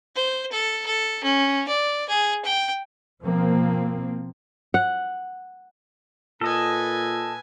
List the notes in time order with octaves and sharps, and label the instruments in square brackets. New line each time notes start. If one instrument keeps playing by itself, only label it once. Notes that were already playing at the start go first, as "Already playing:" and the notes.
[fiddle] C5
A4
A4
C#4
D5
G#4
G5
[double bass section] B2 F3 A#3 C4
[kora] F#5
[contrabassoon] A#2 [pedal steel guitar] A4 D#5 [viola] B4 G#5